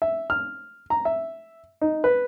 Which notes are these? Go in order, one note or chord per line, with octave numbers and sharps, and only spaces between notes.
E5
F6
A#5
E5
D#4
B4